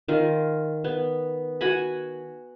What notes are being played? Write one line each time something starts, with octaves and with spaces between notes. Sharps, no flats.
D#3 F4
B3
F#4 F#5 G#5 B5